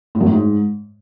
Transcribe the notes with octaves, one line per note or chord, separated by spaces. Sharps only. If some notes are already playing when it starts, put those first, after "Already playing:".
A2
F#2
A2
G#2